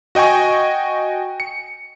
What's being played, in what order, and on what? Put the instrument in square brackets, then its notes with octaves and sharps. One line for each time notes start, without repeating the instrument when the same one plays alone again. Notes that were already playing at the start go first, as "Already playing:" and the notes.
[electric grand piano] F#4 D#5 G5 G#5 C#6
C#7